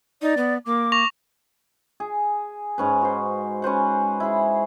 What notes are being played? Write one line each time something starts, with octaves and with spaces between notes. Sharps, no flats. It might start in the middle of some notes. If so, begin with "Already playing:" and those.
D#4 D5
B3
A#3 D6
C#6 A#6 F7
G#4
G#2 C#4 B4
F#4 C5
C#4 B4 C5 F#5
E4 G#4